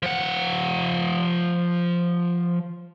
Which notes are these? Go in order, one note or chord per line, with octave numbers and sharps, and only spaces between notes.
F3 F#5